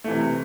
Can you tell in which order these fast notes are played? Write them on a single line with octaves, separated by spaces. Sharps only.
A3 E3 C3